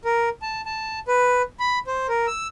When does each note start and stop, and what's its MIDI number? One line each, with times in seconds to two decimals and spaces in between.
0.05 0.29 70
0.42 0.61 81
0.66 0.99 81
1.08 1.42 71
1.60 1.79 83
1.87 2.07 72
2.09 2.26 70
2.27 2.48 88